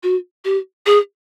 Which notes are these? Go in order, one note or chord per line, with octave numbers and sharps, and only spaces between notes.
F#4
G4
G#4